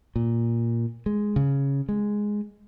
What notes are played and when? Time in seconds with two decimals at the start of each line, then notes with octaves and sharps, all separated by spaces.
0.16 A#2
1.06 G#3
1.36 C#3
1.89 G#3